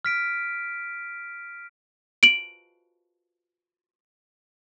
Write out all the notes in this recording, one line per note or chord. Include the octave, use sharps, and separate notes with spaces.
F6 B6 D7
D7 F#7